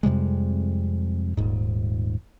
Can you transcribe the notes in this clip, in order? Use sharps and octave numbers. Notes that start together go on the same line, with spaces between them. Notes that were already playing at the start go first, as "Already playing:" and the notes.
F2 C3 G3 G#3
D#1 G#2